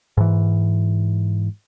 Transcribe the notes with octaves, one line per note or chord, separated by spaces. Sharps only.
G#2 E3